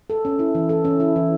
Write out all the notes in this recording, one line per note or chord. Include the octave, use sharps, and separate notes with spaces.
A4
C#4
E4
E3
A4
C#4
E4
E3